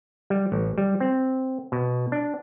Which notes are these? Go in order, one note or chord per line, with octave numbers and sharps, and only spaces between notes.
G3
A1
G3
C4
B2
D4